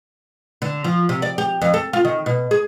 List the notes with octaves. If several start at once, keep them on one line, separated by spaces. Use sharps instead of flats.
D3
F3
C3
D5
G4
F2
A4
F4
D#3
B2
G#4